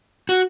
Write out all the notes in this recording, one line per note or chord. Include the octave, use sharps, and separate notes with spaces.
F#4